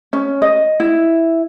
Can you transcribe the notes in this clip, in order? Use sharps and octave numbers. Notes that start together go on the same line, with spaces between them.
C#4
D#5
E4